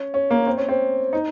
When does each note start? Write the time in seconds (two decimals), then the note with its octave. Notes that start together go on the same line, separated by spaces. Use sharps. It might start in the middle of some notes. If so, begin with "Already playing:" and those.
Already playing: C#4
0.14 C#4
0.31 A#3
0.47 C4
0.58 C#4
0.69 C4
1.13 D#4